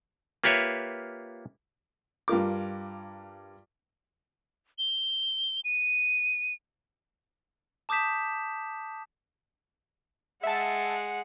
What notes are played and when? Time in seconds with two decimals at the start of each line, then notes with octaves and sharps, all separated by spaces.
0.44 A#3 F4 G4 B4 C#5 E5
2.28 G2 F4 A#4 D6
4.78 G7
5.65 D#7
7.89 A5 D6 D#6 G6 B6 E7
10.43 G#3 E5 F#5 A5